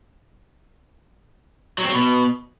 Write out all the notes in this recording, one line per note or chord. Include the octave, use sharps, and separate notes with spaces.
F#3
C4
F#3
B2